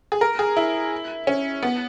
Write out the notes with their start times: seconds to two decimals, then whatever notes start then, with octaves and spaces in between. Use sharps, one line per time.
0.12 G#4
0.21 A#4
0.39 G#4
0.57 E4
1.27 C#4
1.63 B3